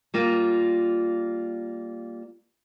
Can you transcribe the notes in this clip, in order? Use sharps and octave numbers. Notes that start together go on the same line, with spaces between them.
G3 A#3 F4